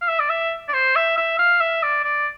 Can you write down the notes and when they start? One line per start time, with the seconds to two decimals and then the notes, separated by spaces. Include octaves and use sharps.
0.01 F5
0.08 E5
0.20 D5
0.29 E5
0.69 D5
0.74 C5
0.96 E5
1.17 E5
1.39 F5
1.61 E5
1.83 D5
2.04 D5